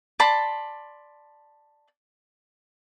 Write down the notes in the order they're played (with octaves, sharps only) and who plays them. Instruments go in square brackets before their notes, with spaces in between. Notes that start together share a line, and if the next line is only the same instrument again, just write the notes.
[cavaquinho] D5 A5 B5 C6